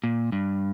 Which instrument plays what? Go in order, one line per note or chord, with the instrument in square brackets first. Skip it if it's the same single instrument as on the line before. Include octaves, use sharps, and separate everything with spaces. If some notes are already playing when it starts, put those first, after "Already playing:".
[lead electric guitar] A#2
G2